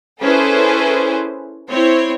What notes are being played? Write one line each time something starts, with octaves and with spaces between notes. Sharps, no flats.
C#4 E4 G#4 A4 B4 C5
C4 E4 C5 C#5